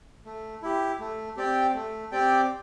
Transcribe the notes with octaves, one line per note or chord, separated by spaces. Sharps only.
A3
E4 G4
A3
C4 G4 D5 G5
A3
C4 G4 D5 G5